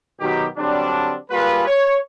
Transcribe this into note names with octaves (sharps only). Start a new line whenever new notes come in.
B2 D#3 F#3 G4
D3 F#3 G3 C4 D4
G3 A#3 F4 G#4 B4
C#5